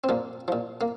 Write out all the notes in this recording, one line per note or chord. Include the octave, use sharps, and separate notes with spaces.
C4
A#2 F3 A#3
A#2 F3
A#3